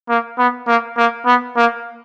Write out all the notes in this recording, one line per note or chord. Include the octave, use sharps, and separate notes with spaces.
A#3
B3
A#3
A#3
B3
A#3